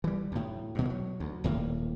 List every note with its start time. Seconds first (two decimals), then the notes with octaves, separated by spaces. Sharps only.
0.04 E3 G3
0.32 D2 A2
0.75 G2 B2
0.90 F#3
1.20 D2
1.44 D#1 A2 A#3